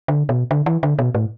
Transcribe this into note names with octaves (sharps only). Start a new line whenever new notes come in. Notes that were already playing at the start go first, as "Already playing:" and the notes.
D3
B2
D3
E3
D3
B2
A2